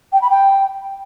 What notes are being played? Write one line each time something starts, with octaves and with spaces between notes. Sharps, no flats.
G5
B5
G5